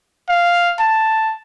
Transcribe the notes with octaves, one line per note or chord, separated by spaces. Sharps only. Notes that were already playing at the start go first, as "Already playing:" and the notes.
F5
A5